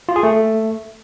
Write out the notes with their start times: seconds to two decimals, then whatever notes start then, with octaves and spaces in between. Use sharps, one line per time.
0.09 F4
0.16 G#4
0.23 A3